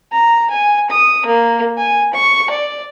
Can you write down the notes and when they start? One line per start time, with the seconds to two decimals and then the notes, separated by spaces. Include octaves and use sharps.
0.12 A#5
0.50 G#5
0.90 D#6
1.26 A#3
1.77 G#5
2.14 C#6
2.50 D5